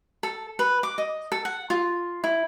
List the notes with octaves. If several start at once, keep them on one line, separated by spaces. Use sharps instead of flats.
A4
B4
D6
D#5
A4
F#5
F4
E4